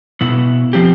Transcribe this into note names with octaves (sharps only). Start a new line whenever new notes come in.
B2 B3 E4
F3 C4 G4